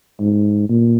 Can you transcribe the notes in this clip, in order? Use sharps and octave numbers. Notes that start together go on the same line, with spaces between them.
G#2
A#2